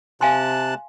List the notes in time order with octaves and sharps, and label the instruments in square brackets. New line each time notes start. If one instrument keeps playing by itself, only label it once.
[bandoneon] C3 A5 F#6 [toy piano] F5 G#5 C6